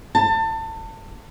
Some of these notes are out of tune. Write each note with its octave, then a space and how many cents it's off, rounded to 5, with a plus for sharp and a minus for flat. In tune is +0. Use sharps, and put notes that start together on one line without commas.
A5 +25